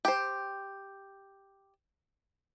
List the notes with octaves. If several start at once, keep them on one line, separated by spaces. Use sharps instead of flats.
G4 C5